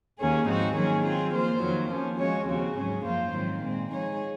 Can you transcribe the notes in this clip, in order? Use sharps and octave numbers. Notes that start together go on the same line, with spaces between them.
D#2 D#3 A#3 C#4 G#4
G#2 F3 C4 D#4 F#4
D#3 F#3 A#3 C#4 G#4
F#3 C4 F4 G#4
F3 A#3 F4 C5
F2 D#3 F#3 A#3
F3 A#3 C#4
F3 G#3 C#4 F#4 C#5
D#2 C#3 F3 C4 F#4
G#2 F#3 C#4 G#4
F#2 F3 A#3 F4 C5
G#2 D#3 F#3 C4
A#2 G#3 C4
F3 G#3 D#4 G#4 C#5